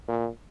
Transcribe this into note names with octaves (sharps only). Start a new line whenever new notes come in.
A#2